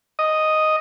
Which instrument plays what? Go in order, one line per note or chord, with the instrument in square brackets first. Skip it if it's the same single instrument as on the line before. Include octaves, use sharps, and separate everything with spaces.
[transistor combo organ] D#5